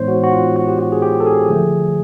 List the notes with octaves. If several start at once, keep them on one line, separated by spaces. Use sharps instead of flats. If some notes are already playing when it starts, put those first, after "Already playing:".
Already playing: A2 E3 G#3 B3 D#4 C5 C#5
F#4
F#4
F4
F#4
G4
F#4
G#4
G4
A4
G#4
D3 F3 A3